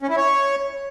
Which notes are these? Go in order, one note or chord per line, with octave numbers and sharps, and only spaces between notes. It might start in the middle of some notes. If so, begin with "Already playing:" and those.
C#4
E4
C#5